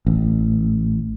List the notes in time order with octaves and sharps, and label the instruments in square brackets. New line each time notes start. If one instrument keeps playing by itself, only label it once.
[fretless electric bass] A1